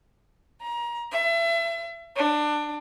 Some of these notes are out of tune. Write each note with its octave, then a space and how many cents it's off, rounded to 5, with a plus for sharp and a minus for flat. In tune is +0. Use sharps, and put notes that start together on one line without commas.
A#5 +30
E5 +30
D4 +20